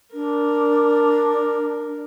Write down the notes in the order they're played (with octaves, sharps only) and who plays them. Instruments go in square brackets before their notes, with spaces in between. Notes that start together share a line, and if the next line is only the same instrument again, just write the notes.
[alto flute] D4 [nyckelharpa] A#4